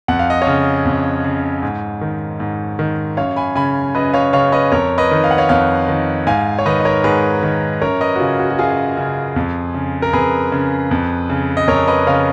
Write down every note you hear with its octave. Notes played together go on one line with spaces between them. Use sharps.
F2 F#5
F5
D#5
C#5 F5
C#3
F2
C#3
G#2
D#3
G#2
D#3
F#2 C#5 F5
G#5 B5
C#3 G#5 B5
F#2 B4 D#5
C#5 F5
C#3 C#5 F5
B4 D#5
F2 A#4 C#5
B4 D#5
D#3
F5
F#5
C#5 F5
F2 C#5 F5
D#3
G#2 F5 G#5
C#5
D#3 B4 D#5
D#5
A#4 C#5
G#2 G#4 B4
D#3
F#2 A#4 C#5
B4 D#5
F#4
C#3 F4
F#4
F#4
F#2 F4 G#4
C#3
F2
C#3
A#4
F2 G#4 B4
C#3
F2
C#3
D#5
F2 A#4 C#5
B4 D#5
C#3 C#5 F5